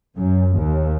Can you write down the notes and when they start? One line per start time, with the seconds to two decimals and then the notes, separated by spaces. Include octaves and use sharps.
0.18 F#2
0.57 D#2